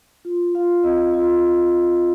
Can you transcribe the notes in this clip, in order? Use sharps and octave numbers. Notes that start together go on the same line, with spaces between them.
F4
F4 F5
C4 D#5
F4